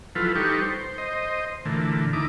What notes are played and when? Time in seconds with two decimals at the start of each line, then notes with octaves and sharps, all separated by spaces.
0.15 F3 F#3 E4 F4 A4 B4
0.35 G3 D#4 G4 A4 B4 C#6
0.61 C5
0.98 C5 D#5
1.65 A#2 D3 E3 A3
2.13 D2 D#4 E4 D6